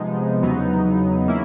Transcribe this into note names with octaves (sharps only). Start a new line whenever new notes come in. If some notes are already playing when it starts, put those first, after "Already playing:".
Already playing: C3 F3 G#3 B3 D#4
E2 C#3 F#3 B3 D#4
A#3 C#4 E4